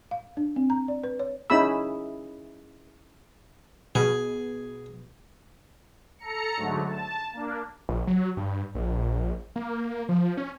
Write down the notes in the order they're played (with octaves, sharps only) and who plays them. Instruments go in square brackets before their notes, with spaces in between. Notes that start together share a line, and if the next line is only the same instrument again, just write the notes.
[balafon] F5
D4
C4
A#5
D5
B4
C#5
[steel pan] C#4 D#4 E4 G#4 B5 E6
[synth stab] B2 [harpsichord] G#4
[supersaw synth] A4 A#5 C#7
G#2 D3 F#3 A3
A5
A#3 D4
[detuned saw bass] A#1
F#3
G2
A#1
A#3
F3
C#4